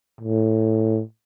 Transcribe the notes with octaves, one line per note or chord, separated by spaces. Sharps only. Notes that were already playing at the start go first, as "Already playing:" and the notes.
A2